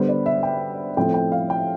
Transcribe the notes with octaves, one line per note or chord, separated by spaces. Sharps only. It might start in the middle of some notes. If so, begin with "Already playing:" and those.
Already playing: D3 G3 B3 C5
D5
E5
G5
A2 F3 A3 C4 G5
G5
F5
G5